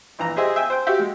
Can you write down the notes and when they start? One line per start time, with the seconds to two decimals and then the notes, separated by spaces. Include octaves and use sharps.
0.19 A#1 E3 A#5
0.36 G4 G#4 C5 D#5 E5
0.56 E5 G5 G#5 E6
0.70 C5 G5
0.87 F#4 G4 E5
0.99 G#3